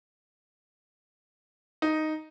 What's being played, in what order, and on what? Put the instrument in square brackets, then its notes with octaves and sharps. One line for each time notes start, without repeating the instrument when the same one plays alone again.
[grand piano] D#4